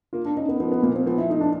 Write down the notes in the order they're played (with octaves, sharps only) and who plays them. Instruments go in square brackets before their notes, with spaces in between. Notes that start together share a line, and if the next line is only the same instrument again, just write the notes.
[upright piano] A#3 [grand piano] F4
[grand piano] D4
[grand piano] C#4 [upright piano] D#4
[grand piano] B3
[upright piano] F3 [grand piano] B3
[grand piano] B3
[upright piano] A#2 [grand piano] A#3
[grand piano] C4
[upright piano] F3 [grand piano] B3
[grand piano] E4
[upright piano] A3 [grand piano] D#4
[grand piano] D4